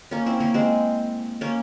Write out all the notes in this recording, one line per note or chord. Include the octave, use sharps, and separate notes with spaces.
A#3 C#4
C4 E4
A#3 C#4
G#3 C4
A#3 C#4